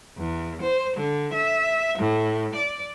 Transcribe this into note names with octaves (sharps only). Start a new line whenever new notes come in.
E2
C5
D3
E5
A2
D5